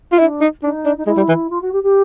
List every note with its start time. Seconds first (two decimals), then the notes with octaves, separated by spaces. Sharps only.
0.12 F4
0.19 D4 E4
0.41 D#4
0.63 D4 D#4
0.85 D4
0.97 D#4
1.06 G#3 E4
1.17 G3
1.28 E3
1.50 F4
1.61 F#4
1.72 G4
1.83 G4